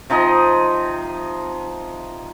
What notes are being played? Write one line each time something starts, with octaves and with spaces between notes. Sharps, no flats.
C3 F3 D#4 D#5